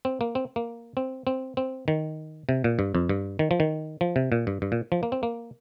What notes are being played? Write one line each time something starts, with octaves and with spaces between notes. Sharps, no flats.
C4
A#3
C4
A#3
C4
C4
C4
D#3
C3
A#2
G2
F2
G2
D#3
F3
D#3
F3
C3
A#2
G2
G2
A#2
F3
A#3
C4
A#3